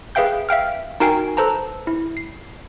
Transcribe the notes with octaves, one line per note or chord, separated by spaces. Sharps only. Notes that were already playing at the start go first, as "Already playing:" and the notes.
G#4 B4 E5 F5 G5 G6
E5 F5 G5 F6
D#4 F#4 A#4 G5 G#5 C7
A4 B4 C5 A5 A#5
E4
C7